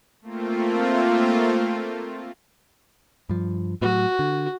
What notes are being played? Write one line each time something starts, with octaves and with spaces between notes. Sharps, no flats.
A3 A#3 C4 F4
G2 F3
A2 F#3 F#4
D3